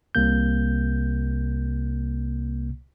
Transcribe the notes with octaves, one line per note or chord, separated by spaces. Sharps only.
C2 C3 A#3 G6